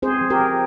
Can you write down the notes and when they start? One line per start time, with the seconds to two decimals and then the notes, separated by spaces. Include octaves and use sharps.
0.02 C4 G#4 C5
0.21 F3
0.30 G4 A#4
0.40 F3